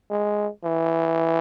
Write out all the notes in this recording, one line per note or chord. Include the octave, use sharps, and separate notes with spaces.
G#3
E3